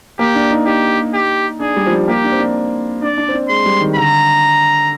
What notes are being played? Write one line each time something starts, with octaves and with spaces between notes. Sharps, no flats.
A#3 G4
D4
D#4
D#4 G4
G4
D4 G#4
G3
F3
G3
A#3 G4
D4
C4
D4
D4 D5
D4
C4
D4
G#3 C6
G3
D#3
D3 A#5